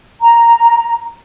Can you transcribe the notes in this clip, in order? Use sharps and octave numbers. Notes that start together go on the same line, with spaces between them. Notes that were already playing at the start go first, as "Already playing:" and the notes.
A#5